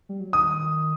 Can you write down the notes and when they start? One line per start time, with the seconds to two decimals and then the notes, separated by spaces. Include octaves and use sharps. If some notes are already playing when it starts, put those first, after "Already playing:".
0.09 G3
0.20 F#3
0.33 D#3 D#6